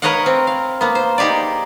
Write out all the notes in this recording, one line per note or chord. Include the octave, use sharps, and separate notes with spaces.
A#4 B4 C#5 D#5 F5 F#5
C4
F5
A#3 B3
C5
D#4 G4 G#4 D5